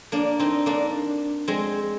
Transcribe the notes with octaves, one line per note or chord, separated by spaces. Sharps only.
A#3 D4
C4 D#4
A#3 D4
G#3 C4